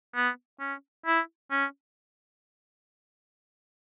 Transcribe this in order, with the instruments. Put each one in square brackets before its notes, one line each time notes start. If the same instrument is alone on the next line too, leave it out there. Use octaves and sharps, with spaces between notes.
[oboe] B3
C#4
E4
C#4